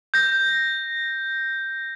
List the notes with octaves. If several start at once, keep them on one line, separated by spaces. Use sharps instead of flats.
G6 A#6